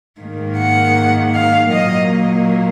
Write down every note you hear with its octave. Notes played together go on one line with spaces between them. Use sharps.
G#2 D#3 A#3
F#5
F5
A#2 F#3 A#3 D#5